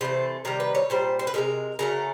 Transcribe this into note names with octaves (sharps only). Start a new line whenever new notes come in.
C3 E3 A3 C5
C3 D#3 G3 A#4
B4
C#5
A#2 G3 C5
C5
B4
C3 F3 G#3 A#4
C#3 F#3 A3 A#4